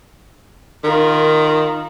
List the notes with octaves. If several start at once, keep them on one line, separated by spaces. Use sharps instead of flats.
D#3 F4 A#4